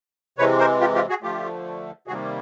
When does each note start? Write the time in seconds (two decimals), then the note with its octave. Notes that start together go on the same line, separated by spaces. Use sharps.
0.38 C3 E3 G#3 B4 C#5
0.59 A#4 C5
0.80 F4 G4
0.95 F4 G4
1.09 F#4 G#4
1.23 D3 F3 A3 F4 G4
2.07 C3 D#3 G3 A#3 F#4 G#4